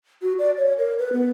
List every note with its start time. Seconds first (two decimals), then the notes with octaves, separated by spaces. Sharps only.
0.22 F#4
0.39 D5
0.58 C#5
0.78 A#4
0.98 B4
1.13 B3